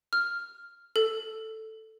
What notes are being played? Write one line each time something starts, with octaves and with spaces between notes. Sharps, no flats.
F6
A4